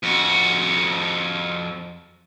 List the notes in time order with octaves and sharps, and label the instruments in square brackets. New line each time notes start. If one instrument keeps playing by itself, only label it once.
[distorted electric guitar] F2 F#4